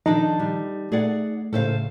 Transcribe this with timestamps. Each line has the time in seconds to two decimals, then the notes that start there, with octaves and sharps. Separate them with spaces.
0.06 D#3 F3 D4 D#4 G#4 A4
0.39 G3
0.92 A3 G#4 D5 F#5
1.53 A2 C#3 A4 C5 F5